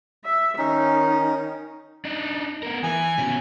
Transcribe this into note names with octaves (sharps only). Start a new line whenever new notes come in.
E5
D#3 C#4 D#4
D4 D#4
B3 A#4
E3 G#5
B2 C#4